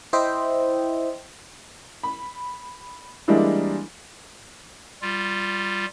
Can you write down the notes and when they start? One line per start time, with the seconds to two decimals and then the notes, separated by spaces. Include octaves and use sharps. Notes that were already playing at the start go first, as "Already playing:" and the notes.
0.13 E4 C5 D#5 E5 G5
2.03 B5
3.28 E3 G3 G#3 A#3 D4 E4
5.02 G3 F4